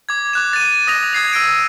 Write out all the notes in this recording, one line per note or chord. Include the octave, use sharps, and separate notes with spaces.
D6 G#6
D6 F#6 E7
A6 D#7
D#6 A#6 F7
D#6 G#6 C7 F7
E6 A#6 D7 D#7